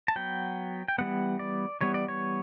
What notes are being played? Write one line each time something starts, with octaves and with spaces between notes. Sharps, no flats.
A5
F#3 B3 G5
G5
E3 G3 B3 F#5
D5
E3 G3 B3 C#5
D5
C#5